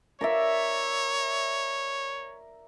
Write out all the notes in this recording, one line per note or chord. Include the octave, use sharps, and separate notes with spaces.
A#4 C#5 D5 E5